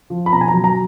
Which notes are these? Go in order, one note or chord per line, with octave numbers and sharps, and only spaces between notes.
F3
B5
B2 A#5
G#5
A#5
F#3
A#5